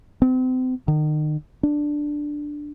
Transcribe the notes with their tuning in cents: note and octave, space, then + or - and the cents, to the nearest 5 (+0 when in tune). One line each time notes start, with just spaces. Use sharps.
C4 -35
D#3 -35
D4 +5